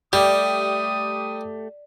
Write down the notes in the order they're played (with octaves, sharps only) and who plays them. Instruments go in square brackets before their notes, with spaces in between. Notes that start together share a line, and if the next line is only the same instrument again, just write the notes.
[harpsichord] G3 [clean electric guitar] A3 G4 [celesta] D5 [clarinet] D#6